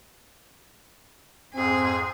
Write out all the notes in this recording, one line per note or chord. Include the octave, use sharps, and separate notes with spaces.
F2 G#2 C4 G#4